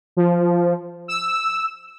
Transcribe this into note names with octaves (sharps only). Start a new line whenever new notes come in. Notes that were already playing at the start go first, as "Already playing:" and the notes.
F3
E6